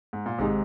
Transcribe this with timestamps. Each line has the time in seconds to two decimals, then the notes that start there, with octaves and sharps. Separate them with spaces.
0.13 G#2
0.26 A#2
0.39 G#1 G#2 C3 D#3 G#3 D#4